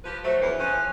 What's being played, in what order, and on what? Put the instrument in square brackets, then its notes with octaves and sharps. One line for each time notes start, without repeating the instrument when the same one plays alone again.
[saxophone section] F3 G4 B4
[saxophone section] F#3 A3 [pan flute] C5
[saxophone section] E2 D3 E3
[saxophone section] F3 C#4 [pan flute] F#6